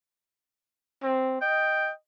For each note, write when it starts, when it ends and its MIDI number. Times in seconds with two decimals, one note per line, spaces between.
1.03 1.41 60
1.41 1.92 75
1.41 1.89 79